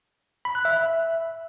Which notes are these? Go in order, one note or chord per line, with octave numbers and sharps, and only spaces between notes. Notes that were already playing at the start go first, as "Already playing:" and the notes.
B5
F#6
E5